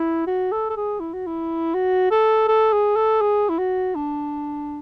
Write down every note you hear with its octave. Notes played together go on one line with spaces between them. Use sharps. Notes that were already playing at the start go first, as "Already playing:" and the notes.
Already playing: E4
F#4
A4
A4
G#4
E4
F#4
E4
F#4
A4
A4
G#4
A4
G#4
E4
F#4
D4